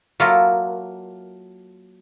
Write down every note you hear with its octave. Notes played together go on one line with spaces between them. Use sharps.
F#3 A#3 E4 F4 A4 A#4